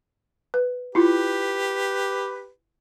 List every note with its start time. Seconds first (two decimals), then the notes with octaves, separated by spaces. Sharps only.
0.54 B4
0.95 E4 F4 G4 B4